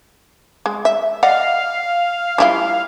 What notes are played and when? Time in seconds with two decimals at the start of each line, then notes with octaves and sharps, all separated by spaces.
0.66 G#3
0.85 E5
1.23 D5 D#5 F5 F#5
2.38 G3 E4 F4